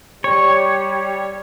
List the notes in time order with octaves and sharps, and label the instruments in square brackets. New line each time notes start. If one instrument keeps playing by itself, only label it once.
[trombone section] G3 [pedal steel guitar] C#5